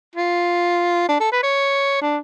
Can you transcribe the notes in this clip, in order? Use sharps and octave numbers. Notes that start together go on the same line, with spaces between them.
F4
D4
A4
B4
C#5
D4